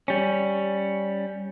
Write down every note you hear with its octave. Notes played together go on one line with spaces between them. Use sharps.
G3 C#4